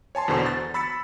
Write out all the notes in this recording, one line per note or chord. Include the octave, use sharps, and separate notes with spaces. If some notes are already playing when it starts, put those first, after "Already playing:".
C#5 G#5 A5 C6
E2 B2 D3 B3 C5 C#6
A6
B5 E6 A6 B6 C#7